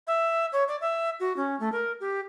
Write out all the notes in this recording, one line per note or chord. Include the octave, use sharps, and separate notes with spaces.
E5
C#5
D5
E5
F#4
C#4
A3
A#4
G4